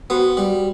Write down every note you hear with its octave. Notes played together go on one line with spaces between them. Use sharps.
B3 F#4 C5 G5 B5
G3